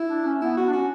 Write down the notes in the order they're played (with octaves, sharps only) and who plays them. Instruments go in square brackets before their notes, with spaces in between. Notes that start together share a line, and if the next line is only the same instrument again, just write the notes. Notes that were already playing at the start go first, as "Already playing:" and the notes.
Already playing: [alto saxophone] E4
[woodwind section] D4
C#4
[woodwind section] B3 [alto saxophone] E4
[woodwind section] B3 [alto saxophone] F#4
[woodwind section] D4
[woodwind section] C#4 [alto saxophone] F#4